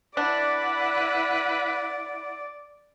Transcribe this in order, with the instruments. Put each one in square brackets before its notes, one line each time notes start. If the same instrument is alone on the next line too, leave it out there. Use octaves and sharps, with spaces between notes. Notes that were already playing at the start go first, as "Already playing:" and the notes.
[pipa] D4 [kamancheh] E4 F#5 [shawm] B4 [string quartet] D5